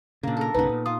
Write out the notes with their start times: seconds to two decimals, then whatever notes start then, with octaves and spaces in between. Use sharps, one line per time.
0.23 A#2 C#3 A#3 D4
0.37 A4 A#4
0.54 B1 G2 C#3 B3 D#4 B4
0.69 A#2
0.86 F4 D#6